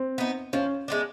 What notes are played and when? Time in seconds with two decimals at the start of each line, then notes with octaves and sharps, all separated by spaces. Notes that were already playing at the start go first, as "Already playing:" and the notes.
Already playing: C4
0.18 B3 D#4
0.53 F3 C#4
0.88 G#3 B3 D4